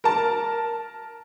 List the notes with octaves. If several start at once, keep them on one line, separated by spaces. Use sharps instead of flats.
A#4 A5